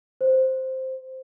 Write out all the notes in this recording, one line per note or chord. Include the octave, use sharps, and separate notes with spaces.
C5